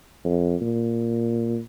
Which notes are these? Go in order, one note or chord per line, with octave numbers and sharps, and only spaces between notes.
F2
A#2